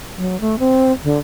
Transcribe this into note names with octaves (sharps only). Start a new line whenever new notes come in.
F#3
A3
C4
D3